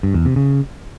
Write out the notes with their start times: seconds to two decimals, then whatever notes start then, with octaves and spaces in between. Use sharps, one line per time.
0.03 G2
0.14 E2
0.25 C3
0.36 C#3